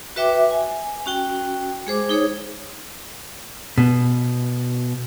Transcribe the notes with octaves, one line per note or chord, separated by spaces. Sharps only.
F#4 B4 E5 G5 D6
G#5
C#4 F#4 G5
G#3 G#4 C5 D6
D#4 G#4 C5 C#5
B2